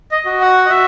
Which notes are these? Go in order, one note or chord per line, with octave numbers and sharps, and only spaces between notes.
D#5
F#4
F#5
D#5
F#4 E5